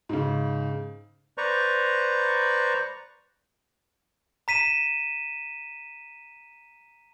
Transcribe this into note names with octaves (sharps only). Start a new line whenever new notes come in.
G#2 C#3
B4 C5 D5 A#5 C#6
A#5 B6 D#7 E7